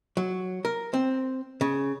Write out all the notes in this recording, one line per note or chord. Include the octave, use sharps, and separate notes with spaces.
F#3
A#4
C4
C#3